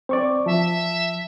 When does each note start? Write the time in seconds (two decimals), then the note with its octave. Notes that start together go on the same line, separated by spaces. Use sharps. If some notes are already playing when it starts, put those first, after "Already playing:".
0.09 C4 C5 D5 C#6
0.46 F3 E5 A5